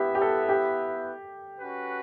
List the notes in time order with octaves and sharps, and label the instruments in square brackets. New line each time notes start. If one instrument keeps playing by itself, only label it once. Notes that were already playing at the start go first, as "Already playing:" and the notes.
Already playing: [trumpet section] B3 E4 B4 E5 [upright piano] G4
[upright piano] G4
A4
G4
[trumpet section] C#4 F#4 B4